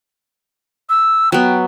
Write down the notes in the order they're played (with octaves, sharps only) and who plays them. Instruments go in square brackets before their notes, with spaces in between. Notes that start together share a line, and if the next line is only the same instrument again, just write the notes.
[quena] E6
[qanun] F#3 B3 [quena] G5